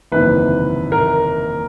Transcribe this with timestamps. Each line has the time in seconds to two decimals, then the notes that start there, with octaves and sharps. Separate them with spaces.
0.12 F#1 E2 C3 D#3 B4
0.92 A#4